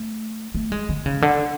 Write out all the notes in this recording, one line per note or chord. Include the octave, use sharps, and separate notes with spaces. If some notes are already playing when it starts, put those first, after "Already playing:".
Already playing: A3
A3
G#3
D3
C#3
D3